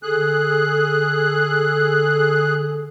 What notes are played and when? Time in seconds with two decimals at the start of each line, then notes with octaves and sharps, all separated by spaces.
0.03 D3 G#4 A4 F#6